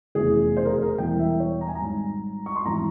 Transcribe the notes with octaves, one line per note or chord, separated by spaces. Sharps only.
F1 E2 C#3 G#4
C5
A#4
G#4
A#4
E1 E2 E3 G3 G5
E5
C#5
A#5
G#5
A#5
G#1 G#2 G3
C#6
C6
G#1 E3 G3 A#5